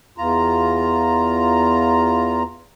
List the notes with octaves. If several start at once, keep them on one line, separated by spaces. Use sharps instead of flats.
E2 F4 A#5